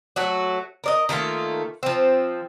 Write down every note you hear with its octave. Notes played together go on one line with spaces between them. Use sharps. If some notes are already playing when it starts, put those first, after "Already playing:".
F#3 A3 F#4
A#4 D5 D#5
D#3 A3 A#3 F4
F3 C4